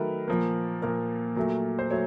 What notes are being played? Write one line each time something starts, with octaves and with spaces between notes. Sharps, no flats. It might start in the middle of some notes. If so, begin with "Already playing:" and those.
Already playing: D#3 F#3 A3 A#4 B4
A#2 F3 A#3
A#2 F3 A#3 A#4
A#2 F#3 A3
C5
F#3 A3 C#5